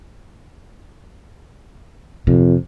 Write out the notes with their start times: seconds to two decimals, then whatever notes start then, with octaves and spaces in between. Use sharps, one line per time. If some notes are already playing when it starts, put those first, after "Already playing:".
2.27 F2 C3